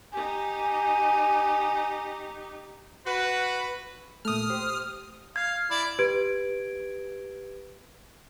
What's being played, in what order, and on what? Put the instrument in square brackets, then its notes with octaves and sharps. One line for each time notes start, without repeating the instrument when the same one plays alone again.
[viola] D#4 G4 [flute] G#5
[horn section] F#4 B4
[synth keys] A#2 A3 [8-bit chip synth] D#6 F6
[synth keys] G4 C5
[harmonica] F5 [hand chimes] G#6
[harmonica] E4 D5
[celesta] G4 B4 G#6 D7